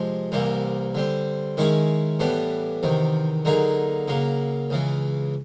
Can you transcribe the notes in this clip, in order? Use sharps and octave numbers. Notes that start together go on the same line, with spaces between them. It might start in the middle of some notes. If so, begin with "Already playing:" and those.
Already playing: C3 F3 G#3
C2 C3 E3 G3 A#3
D3 G3 C4
D#3 G#3 C#4 E4 G#4
A2 E3 G3 B3 D4
E2 C3 D#3
D3 F#3 A#3 D#4 G#4
C#3 F#3 A#3
C#2 C#3 E3